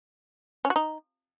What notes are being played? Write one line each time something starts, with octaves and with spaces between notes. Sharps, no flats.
C#4
F#4
D#4